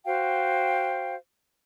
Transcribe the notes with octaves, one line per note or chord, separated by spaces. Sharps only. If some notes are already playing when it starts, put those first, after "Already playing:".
F#4 C5 F5 G5